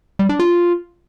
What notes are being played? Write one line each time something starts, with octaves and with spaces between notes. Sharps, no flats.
G3
D4
F4